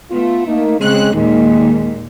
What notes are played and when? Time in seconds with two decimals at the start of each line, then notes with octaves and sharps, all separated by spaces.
0.11 A3 B3 F4
0.48 A#3 D#4
0.80 C#3 G#3 C4 F#6
1.14 D#2 A#2 D#3 G#3